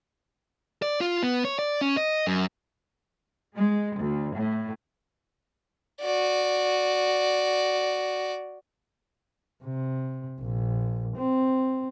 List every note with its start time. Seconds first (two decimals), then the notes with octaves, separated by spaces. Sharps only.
0.82 D5
1.01 F4
1.23 B3
1.45 C#5
1.59 D5
1.81 C#4
1.97 D#5
2.27 F#2
3.57 G#3
3.97 D2
4.37 A2
6.01 F#4 D5
9.64 C3
10.41 A#1
11.17 C4